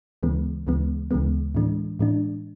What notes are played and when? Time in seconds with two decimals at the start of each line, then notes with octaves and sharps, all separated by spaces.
0.23 D2 C#3 E3 G#3 B3
0.67 D2 C#3 E3 G#3 B3
1.11 D2 C#3 E3 G#3 B3
1.55 A2 E3 G#3 D4
1.99 A2 E3 G#3 D4